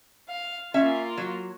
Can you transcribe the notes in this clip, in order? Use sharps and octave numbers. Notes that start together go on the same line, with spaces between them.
F5
A#3 C#4 F4 E5 G#5
F#3